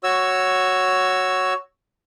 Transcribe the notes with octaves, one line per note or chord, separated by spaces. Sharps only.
F#4 C#5 E6